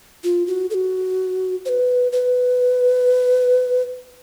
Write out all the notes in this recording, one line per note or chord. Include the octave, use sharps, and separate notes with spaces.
F4
F#4
A4
F#4
C5
B4
B4